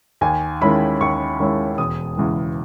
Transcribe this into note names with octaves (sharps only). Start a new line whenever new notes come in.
D#2 G#5
D#3 G#3 C#4 E4 B5
D#2 C#6
D#3 G#3 C#4 E4
E1 D#6
E2 C#3 E3 G#3